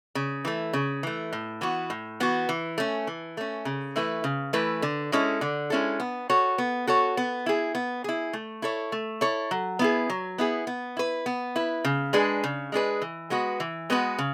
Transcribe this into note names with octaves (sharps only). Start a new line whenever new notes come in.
C#3
E3 A3
C#3
E3 A3
A2
E3 B3 F#4
A2
E3 B3 F#4
E3
A3 C#4
E3
A3 C#4
C#3
E3 A3 E4 B4
C#3
E3 A3 E4 B4
D3
G#3 C#4 E4 A4
D3
G#3 C#4 E4 A4
B3
F#4 A4 C#5
B3
F#4 A4 C#5
B3
E4 G#4
B3
E4 G#4
A3
E4 A4 C#5
A3
E4 A4 C#5
F#3
B3 E4 G#4
F#3
B3 E4 G#4
B3
E4 B4
B3
E4 B4
C#3
G#3 D4 G#4 B4
C#3
G#3 D4 G#4 B4
E3
G#3 B3 F#4 B4
E3
G#3 B3 F#4 B4
C#3